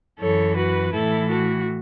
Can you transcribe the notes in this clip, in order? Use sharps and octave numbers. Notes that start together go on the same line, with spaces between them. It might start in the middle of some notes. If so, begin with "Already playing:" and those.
F#2 E3 A4 C#5
F#4 B4
A2 E3 E4 A4
F#4